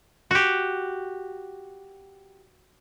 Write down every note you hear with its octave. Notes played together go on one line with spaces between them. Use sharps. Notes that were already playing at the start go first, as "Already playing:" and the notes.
F#4 G4